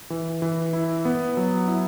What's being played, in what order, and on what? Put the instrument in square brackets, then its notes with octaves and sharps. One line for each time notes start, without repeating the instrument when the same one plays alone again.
[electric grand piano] E3
E3
E4
B3
F#3
E4